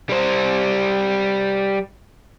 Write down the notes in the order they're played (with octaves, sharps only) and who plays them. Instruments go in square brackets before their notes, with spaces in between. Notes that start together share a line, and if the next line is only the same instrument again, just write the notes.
[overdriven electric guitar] G3 C5